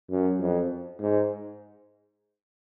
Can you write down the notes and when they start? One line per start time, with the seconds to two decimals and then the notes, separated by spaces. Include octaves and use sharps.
0.10 F#2
0.40 F2
0.99 G#2